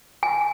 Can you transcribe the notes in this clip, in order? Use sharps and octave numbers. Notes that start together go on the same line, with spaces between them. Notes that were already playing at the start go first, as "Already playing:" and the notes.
G#5